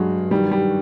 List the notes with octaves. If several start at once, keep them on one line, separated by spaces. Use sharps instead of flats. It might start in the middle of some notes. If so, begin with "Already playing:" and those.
Already playing: G2 F#3 G#3
D#3 G3
G3